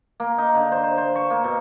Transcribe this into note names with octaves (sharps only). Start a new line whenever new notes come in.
A#3
D#4
D3
C5
C5
C5
C#6
A#3
B2